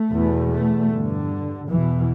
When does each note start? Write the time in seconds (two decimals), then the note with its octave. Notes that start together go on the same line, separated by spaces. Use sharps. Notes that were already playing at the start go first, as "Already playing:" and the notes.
Already playing: A3
0.11 E2 B2
0.51 A3
0.89 G2 D3
1.69 E2 B2 E3